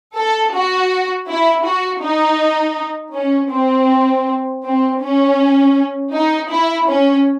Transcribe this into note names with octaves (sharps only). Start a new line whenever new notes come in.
A4
F#4
E4
F#4
D#4
C#4
C4
C4
C#4
D#4
E4
C#4